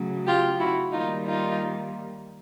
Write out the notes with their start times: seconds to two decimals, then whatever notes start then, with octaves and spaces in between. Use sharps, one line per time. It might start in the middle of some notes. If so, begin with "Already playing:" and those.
Already playing: C#3 F#3 A3
0.26 F4 G4
0.59 E4 F#4
0.92 D#3 G3 A#3 D#4 F4
1.25 D#4 F4